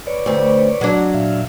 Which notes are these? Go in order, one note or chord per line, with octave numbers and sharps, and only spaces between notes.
B4 C#5 D5
D2 C4
F#3 D4
A#2 E5 F5